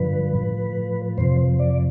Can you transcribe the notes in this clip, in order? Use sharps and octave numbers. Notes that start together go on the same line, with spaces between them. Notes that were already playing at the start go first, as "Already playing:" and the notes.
Already playing: G2 D3 F3 B4
A2 F3
F2 C3 F3 C5
D5